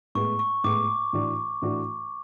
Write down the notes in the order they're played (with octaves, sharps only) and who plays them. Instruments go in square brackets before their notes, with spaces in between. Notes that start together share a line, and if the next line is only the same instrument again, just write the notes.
[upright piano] A2 G#3 B3 [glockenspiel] C#6
[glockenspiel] C#6
[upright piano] A2 G#3 B3 [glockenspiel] D6
[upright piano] A2 E3 A3 D4 F#4
A2 E3 A3 D4 F#4